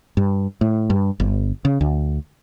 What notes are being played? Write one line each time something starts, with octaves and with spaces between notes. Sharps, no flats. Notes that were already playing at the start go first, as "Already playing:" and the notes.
G2
A2
G2
G1
C#3
D2